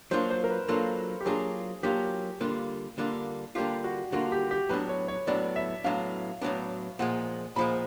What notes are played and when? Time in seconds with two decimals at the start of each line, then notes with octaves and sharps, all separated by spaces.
0.11 F#3 A#3 D4 F4 C5
0.30 C5
0.44 A#4
0.50 B4
0.68 F#3 A#3 D4 F4 A4
1.21 G4
1.26 F#3 A#3 D4 F4 G#4
1.83 F#3 A#3 D4 F4 G4
2.41 D3 G3 A#3 D4 F4
2.98 D3 G3 A#3 D4 F4
3.55 D3 G3 A#3 D4 F4 G4
3.84 F#4
4.12 D3 G3 A#3 D4 F4 F#4
4.32 G4
4.51 G4
4.69 A2 F#3 B3 D4 B4
4.89 C#5
5.08 C#5
5.27 A2 F#3 B3 D4 D5
5.56 E5
5.84 A2 F#3 B3 D4 F5
6.42 A2 F#3 B3 D4
6.99 A#2 F3 G#3 F#5
7.56 A#2 F3 G#3 B5